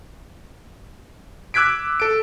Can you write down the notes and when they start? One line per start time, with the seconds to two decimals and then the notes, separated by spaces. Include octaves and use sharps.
1.54 D6 E6 F#6 G#6 B6 D7
2.00 A4 D7